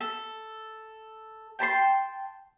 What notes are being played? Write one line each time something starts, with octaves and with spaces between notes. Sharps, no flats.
A4
G5 A5 B5 C6